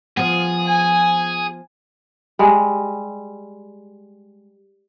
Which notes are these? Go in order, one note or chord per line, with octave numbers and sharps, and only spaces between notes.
F3 B3 G#4
G#5
G3 G#3